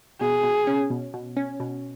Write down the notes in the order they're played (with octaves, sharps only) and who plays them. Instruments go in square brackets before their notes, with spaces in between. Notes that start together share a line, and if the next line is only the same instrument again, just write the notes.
[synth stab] B2 [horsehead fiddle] G#4
[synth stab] B2
C#4
B2
B2
C#4
B2